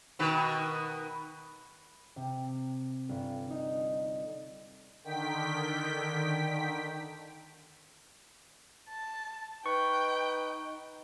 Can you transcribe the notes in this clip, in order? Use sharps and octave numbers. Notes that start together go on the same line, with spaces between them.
B2 D#3 B4
C3
G1
D#4
D3 D#3 G5 B6
A5
D#4 B4 G5 C#6